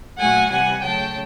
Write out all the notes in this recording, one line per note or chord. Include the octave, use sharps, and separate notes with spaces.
A#2 F#3 A3 F#5 G#5
C3 E3 G3 F#5 G#5
C#3 F#3 A3 G5 A5